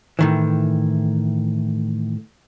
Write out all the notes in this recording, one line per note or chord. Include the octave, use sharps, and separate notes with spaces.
A2 D#3 E3